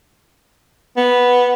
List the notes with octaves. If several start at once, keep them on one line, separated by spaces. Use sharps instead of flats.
B3